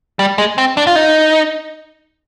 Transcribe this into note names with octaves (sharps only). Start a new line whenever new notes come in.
G3
G#3
C4
D4
F4
D#4